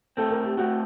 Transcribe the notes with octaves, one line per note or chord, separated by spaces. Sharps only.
A2 A3 C4 A4
A#4
G4
A2 A3 C4 F#4